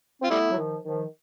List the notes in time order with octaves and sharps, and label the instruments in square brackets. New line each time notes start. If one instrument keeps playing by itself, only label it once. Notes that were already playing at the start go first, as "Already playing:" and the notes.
[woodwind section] C4 [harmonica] F4
[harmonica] G3 E4 [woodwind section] A3 B3
[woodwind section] F#3
D#3 F3
D#3 F3